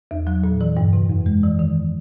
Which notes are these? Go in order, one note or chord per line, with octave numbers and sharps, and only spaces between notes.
E2
F#3
A#2
E3
G2
C3
F2
G#3
E3
D#3